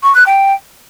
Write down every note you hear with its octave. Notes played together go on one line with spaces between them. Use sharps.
C#6
F#6
G5